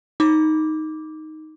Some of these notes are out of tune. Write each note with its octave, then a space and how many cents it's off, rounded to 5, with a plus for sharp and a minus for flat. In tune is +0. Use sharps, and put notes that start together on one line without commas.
D#4 +5 D6 -5